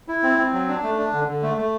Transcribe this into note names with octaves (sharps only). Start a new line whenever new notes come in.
E4
C4
C4
F#3
D4
A3
D4
D3
D3
A3
A3